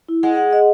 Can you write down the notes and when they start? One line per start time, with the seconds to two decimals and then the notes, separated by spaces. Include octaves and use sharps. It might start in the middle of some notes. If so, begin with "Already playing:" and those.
0.09 E4
0.23 G#3 F#5
0.37 F#5
0.53 D#5